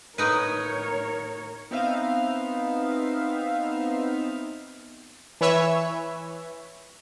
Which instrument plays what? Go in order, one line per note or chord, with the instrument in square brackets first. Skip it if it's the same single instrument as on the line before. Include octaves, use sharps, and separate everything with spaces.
[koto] A2 D#4 B4 [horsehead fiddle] A#4 C#5
[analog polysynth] B3 C4 D#4 E5 F5
[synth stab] E3 B4 C#5 E5